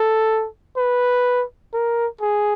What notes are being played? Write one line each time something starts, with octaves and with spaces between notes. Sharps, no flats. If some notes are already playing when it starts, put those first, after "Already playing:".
Already playing: A4
B4
A#4
G#4